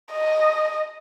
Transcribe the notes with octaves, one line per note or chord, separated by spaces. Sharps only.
D#5